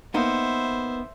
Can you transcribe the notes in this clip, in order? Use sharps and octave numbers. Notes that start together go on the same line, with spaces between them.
A#3 B3 D#4 C5 E5